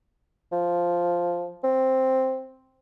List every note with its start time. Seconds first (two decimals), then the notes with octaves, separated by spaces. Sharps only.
0.52 F3
1.64 C4